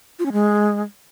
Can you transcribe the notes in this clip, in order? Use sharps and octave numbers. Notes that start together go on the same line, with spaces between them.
F4
C#4
G#3